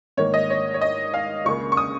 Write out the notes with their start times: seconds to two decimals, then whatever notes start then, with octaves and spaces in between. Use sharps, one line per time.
0.17 G#2 D#3 A#3 C#5
0.34 D#5
0.50 C#5
0.74 C#5
0.81 D#5
1.14 F5
1.45 C#2 C#3 A#3 C#6
1.72 C#6
1.77 D#6